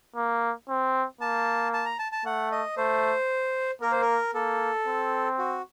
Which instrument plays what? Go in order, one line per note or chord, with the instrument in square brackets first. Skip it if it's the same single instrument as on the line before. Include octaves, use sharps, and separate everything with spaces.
[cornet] A#3
C4
[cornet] A#3 [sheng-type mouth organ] A5
[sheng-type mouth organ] A5
A#5
A5
A5
[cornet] A3 [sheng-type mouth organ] F#5
[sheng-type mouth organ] D#5
[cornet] A3 [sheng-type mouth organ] C5
[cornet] A#3 [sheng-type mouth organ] A#4
[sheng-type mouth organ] C5
A#4
[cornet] A#3 [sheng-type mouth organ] A4
[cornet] C4
[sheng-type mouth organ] F#4